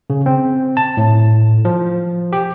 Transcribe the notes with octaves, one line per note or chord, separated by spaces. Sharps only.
C#3
C4
A5
A2
F3
G4